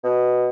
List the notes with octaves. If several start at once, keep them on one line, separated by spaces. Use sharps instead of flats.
B2